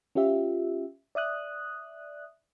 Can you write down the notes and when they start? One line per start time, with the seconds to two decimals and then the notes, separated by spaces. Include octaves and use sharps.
0.15 C#4 F4 G4 E5
1.15 D5 E5 D#6 F#6